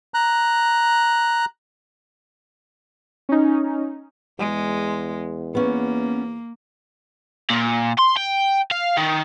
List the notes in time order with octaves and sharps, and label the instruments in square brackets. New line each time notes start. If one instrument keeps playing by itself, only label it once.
[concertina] A#5 F#6
[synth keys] C#4 D#4
[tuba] E2 [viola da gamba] G#3
[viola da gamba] A#3 [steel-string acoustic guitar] B3 C#4
[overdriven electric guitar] A#2
C6
G5
F5
D#3